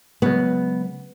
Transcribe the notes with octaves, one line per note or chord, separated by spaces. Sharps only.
C#3 F#3 G#3 B3